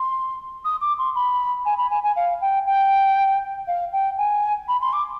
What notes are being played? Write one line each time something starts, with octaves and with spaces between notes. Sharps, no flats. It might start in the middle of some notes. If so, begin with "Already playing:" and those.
Already playing: C6
D#6
D6
C6
B5
G#5
B5
G#5
G#5
F5
G5
G5
F5
G5
G#5
B5
C6
D6